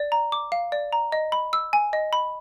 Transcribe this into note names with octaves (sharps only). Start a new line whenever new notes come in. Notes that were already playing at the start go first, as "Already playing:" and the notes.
Already playing: D5
A#5
D6
F5
D5
A#5
D#5
B5
E6
G#5
D#5
B5